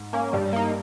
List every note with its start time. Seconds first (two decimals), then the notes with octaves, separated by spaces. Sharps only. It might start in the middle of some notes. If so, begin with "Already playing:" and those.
Already playing: G#2
0.13 A#3 C#4
0.33 G2 G3
0.53 A#3 D#4